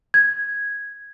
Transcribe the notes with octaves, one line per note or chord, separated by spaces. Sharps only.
G#6